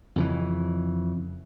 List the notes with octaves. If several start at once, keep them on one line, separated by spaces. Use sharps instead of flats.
F2 C#3 E3